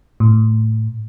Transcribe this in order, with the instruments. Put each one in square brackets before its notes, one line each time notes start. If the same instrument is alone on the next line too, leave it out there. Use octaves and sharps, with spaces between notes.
[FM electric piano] A2